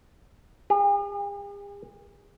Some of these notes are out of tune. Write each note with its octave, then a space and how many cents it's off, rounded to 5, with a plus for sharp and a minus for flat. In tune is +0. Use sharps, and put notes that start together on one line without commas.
G#4 -45